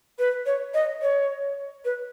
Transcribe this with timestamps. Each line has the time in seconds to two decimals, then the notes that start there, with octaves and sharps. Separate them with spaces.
0.19 B4
0.46 C#5
0.74 D#5
1.02 C#5
1.85 B4